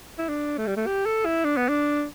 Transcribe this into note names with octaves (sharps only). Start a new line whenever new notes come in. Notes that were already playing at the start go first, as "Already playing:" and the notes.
E4
D4
A3
G3
A3
G4
A4
E4
D4
B3
D4